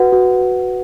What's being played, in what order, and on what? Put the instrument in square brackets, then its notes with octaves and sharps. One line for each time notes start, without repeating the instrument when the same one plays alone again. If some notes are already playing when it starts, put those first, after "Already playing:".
Already playing: [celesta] F#4 B4 F#5
F#4